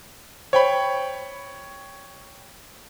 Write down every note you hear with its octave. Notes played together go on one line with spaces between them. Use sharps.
C5 C#5 G5 B5